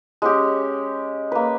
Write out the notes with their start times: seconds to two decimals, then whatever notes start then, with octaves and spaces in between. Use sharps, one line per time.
0.22 G#3 C#4 G4
1.32 A#3 B4